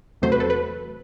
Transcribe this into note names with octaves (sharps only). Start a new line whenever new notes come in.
E2 C3 F#3 A3 C5
B4
A4
B4